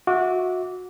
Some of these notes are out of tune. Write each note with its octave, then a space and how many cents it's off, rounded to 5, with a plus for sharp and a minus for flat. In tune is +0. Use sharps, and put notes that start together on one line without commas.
F#4 -25 E5 -30 D6 -15